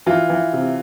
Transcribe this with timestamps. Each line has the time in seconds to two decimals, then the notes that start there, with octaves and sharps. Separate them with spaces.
0.06 E3 F4
0.30 E3
0.53 C3